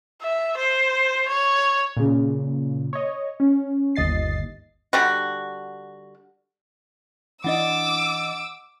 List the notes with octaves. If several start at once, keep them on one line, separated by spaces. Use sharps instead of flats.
E5
C5
C#5
A#2 C#3
C#5 D#5
C#4
G1 D#2 D#5 A6 C7
D3 G3 F#4
E3 D4 D#5 F#5 D6 E6